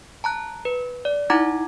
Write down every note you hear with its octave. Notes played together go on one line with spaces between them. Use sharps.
A5 A#5 F#6
B4
D5
D#4 E4 F#5 A#5 D6 G#6